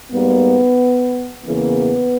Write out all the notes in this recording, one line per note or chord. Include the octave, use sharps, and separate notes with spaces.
G#2 G3 A#3 B3
E2 C#3 E3 A#3 B3